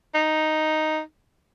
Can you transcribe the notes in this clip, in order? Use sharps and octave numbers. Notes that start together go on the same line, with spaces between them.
D#4